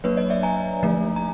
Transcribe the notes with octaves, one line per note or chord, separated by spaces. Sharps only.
F#3 A#3 D4 B4 C#5
C#5 D#5
D5 E5
G#5 A#5
D3 F3 A3
A#5